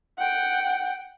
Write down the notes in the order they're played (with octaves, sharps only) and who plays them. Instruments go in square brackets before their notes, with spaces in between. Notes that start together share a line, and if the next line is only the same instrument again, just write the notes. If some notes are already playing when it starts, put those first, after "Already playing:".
[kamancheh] F#5 G5